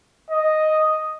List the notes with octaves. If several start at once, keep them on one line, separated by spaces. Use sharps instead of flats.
D#5